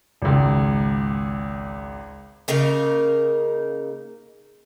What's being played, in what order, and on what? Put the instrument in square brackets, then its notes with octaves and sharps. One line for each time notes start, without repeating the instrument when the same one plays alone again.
[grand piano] G#1 C#2
[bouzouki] C#3 A#3 D#4 A#4